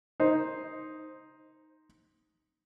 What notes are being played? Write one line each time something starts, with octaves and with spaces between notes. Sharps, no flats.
D#4 C5